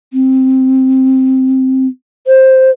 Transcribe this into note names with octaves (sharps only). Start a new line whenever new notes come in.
C4
C5